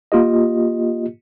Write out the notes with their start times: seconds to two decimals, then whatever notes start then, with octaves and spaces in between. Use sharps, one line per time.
0.12 A#3 F4 G4 D#5